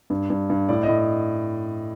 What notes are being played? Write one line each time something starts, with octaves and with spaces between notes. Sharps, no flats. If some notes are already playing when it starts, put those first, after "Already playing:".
G2
G2
G2
A2 D5
A2 D#5
D#5